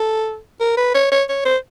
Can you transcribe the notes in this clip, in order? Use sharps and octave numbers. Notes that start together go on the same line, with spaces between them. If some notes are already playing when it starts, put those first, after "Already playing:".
Already playing: A4
A#4
B4
C#5
C#5
C#5
C5